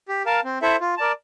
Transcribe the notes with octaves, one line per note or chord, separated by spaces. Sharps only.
G4
A#4 F5 A5
C4
E4 A4 C5 E5
F4
A#4 D5 A5